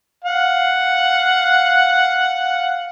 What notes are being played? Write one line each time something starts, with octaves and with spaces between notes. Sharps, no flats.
F5 F#5